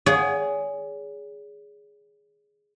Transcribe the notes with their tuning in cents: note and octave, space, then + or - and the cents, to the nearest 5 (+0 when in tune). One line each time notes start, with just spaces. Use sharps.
G#4 +0 C#5 +45 F#5 +15